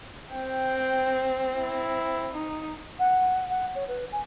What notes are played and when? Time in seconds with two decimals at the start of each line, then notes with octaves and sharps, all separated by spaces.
0.33 C4 G5
1.57 E4
2.33 D#4
2.99 F#5
3.49 F#5
3.75 C#5
3.88 B4
4.12 G#5